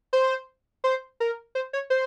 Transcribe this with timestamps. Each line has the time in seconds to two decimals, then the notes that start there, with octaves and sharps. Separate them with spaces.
0.13 C5
0.84 C5
1.20 A#4
1.55 C5
1.73 C#5
1.90 C5